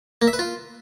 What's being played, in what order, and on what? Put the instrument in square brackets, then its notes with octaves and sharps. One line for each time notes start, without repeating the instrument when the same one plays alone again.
[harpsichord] A#3
E5
B4
F4